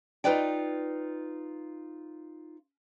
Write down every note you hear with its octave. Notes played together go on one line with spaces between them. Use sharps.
D#4 F4 B4 D5 G5